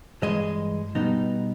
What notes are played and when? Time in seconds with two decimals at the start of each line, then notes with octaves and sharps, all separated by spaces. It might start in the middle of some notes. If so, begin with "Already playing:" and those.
0.22 G2 E3 G#3 D#5
0.95 B2 G3 B3 D#4